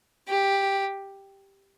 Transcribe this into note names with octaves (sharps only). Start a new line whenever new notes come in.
G4